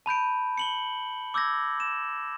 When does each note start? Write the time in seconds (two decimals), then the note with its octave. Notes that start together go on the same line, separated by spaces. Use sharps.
0.06 A5 B5 G6 D7
0.58 C#7 F#7 G7
1.34 D6 E6 G6 G#6 A#6
1.80 E7